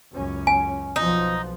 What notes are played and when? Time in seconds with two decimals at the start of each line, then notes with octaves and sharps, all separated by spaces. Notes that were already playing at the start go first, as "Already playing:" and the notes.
0.13 C#2 F#2 C#4
0.47 G#5
0.96 B1 F3 B3 D#4